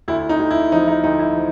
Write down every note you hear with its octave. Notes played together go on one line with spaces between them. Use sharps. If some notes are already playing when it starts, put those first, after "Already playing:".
D2 E4
D#4
D2
E4
F3 D#4
D#4
D2 D#4
E4
F3